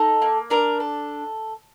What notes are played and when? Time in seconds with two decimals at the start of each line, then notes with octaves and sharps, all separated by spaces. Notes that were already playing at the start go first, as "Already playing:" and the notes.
Already playing: D#4 A4
0.22 A#3
0.50 D4 A#4
0.80 A4